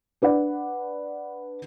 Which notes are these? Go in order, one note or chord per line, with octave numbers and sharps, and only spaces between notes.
D4 B4 D5 F#5